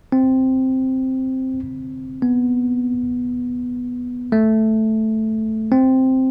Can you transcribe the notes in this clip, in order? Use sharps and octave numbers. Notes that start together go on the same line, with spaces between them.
C4
B3
A3
C4